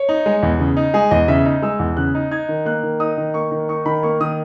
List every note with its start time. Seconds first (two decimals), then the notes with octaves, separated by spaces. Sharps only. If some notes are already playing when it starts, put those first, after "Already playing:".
Already playing: C#5
0.09 D#4
0.26 G#3
0.43 E2
0.60 C#3
0.77 D#4
0.94 G#3 G#4
1.11 E2 D#5
1.28 C#3 E5
1.45 D#4
1.62 G#3 E6
1.79 E2
1.97 C#3 F#6
2.15 D#4
2.31 D#4 G#6
2.49 D#3
2.65 A#3 F#6
2.83 D#3
3.00 D#4 D#6
3.17 D#3
3.34 A#3 C#6
3.51 D#3
3.69 D#4 C#6
3.86 D#3 B5
4.03 A#3 C#6
4.20 D#3 D#6